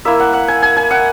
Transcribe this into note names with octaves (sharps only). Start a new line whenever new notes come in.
A#3 E4 E5
F#5
F#5
G#5
G#5
G#5
F#5